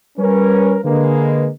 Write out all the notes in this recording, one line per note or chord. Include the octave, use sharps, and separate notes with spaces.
G3 C#4 A#4 B4
D3 G#3 A#3 B4